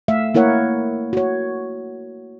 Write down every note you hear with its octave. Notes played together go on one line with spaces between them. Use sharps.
A3 E5 F5
A#3 E4 A#4 C#5 F#5
F#4 C#5